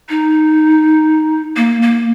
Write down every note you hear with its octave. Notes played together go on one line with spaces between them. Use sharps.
D#4
A#3
A#3